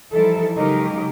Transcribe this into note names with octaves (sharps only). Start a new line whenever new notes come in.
E3 F3 G3 D#4 E4 A4
C#3 F#3 G#3 D#4 G4 A#4